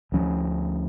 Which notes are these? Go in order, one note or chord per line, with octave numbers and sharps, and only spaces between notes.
D2 D3 F3 C#4